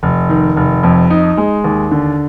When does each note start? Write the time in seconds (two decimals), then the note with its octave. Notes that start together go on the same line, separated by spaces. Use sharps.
0.03 F1
0.29 D#3
0.56 F1
0.83 F2
1.10 D#4
1.37 G#3
1.64 D#2
1.91 D3